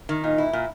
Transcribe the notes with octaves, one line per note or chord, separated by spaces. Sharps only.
D#3
A#2 D#4
E4
A#2